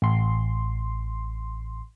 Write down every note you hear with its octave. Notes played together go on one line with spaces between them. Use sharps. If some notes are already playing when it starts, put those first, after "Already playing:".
A1 C6